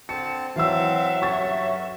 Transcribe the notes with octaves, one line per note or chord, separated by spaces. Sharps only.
D3 C4 A5 C#7
E3 F#3 C4 E5 F5 E6
G2 D3 C#4 C#6 A6